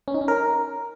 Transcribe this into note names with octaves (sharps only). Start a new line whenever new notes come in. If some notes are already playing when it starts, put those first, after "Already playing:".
C#4
D#4
C#4
A#4